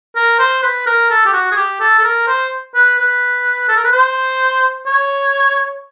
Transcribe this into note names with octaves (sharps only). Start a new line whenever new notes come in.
A#4
C5
B4
A#4
A4
G4
F#4
G#4
G4
A4
A4
A#4
C5
B4
B4
A4
A#4
B4
C5
C#5